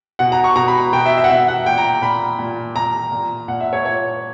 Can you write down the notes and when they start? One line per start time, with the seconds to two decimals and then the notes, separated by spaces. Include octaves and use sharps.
0.19 B2 F#5
0.32 A#5
0.44 C#6
0.56 B2 A#5
0.68 B5
0.93 B2 G5
1.06 E5
1.18 E5
1.24 F#5
1.30 B2 E5
1.48 F#5
1.66 A#2 G5
1.78 A#5
2.02 A#2 B5
2.39 A#2
2.75 A#2 A#5
3.12 A#2
3.48 A#2 F#5
3.60 E5
3.73 C#5
3.85 A#2 C#5